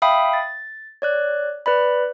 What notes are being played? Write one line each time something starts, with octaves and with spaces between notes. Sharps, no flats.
E5 F5 G5 B5 D#6
A6
C#5 D5 F#6
B4 D5 B5